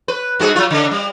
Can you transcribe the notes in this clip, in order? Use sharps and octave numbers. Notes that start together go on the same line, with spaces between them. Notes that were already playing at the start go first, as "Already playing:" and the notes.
B4
G2 F#4 G#4
F#3 F4
C#3
G3